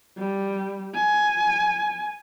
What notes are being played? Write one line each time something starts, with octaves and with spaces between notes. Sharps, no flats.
G3
G#5